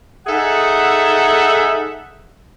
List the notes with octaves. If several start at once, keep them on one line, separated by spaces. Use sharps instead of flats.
D#4 G#4 A4 E5 F#5